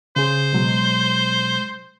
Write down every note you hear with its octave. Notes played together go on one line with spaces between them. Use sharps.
C#3 G#4 C5
B2 F#3 G#3